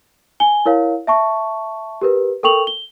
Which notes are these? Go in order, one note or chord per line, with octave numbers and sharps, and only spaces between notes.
G#5 G7
E4 A#4 C#5 F5
E5 A5 C#6
G4 A#4 B4
A4 A#4 G5 C#6 F7 F#7
G7